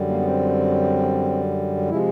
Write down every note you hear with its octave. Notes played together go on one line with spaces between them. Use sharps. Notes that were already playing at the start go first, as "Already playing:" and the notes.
Already playing: F#2 D3 G3
A#3
B3
C4
C3 F3 G#3 E4